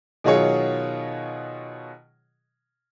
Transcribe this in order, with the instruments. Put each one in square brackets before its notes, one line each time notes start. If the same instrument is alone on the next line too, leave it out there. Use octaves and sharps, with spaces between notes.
[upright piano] B2 D#3 F#3 F4 G#4 C#5